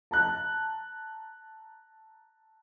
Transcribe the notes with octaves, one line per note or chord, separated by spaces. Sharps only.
A5 A#5 F#6